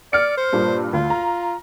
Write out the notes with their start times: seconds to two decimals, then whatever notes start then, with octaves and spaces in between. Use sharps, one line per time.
0.13 D5 F6 C#7
0.38 C5
0.53 G2 A#2
0.93 D2 F4
1.10 A#5